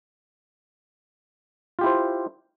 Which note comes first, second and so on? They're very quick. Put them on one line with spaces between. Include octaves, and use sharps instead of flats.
F4 G4 E4 C5